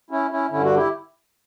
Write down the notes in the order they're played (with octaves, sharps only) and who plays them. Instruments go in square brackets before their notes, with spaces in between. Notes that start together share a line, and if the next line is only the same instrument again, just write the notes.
[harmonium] C#4 E4
C#4 E4
G2 D3 C#4 E4
D4 F#4
E4 G4